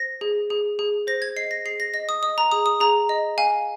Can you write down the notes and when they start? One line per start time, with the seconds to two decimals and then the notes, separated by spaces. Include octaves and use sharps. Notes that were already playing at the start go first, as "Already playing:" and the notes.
Already playing: C5 A#6
0.21 G#4
0.50 G#4
0.79 G#4
1.07 C5 A#6
1.22 G#6
1.36 D#5 C7
1.51 A#6
1.65 G#4 C7
1.80 A#6
1.94 D#5 A#6
2.09 D#6
2.23 D#5 D#6
2.38 A#5
2.52 G#4 D#6
2.66 D#6
2.80 G#4 A#5
3.09 D#5
3.38 F5 G#5